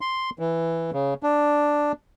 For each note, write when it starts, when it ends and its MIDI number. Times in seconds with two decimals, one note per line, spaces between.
0.01 0.30 84
0.39 0.91 52
0.93 1.14 49
1.23 1.92 62